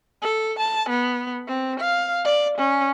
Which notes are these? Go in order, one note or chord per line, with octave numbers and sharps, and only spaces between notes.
A4
A5
B3
C4
F5
D5
C#4